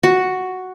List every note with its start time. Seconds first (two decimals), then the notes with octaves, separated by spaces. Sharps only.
0.03 F#4